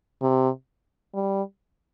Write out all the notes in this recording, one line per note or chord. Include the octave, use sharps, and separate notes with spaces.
C3
G3